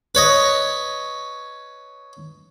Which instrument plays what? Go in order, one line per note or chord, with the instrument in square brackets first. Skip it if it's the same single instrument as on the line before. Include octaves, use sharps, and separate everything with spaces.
[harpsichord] B4 C#5 D#5